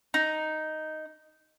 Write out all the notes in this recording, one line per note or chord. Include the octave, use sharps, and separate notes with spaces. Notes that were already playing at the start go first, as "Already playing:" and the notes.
D#4